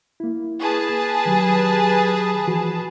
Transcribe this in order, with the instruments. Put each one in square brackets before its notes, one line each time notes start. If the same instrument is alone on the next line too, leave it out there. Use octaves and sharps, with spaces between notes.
[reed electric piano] A#3 E4
[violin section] G#4 B4 A5
[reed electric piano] D#3 F#3 G4
E3 F3 F#4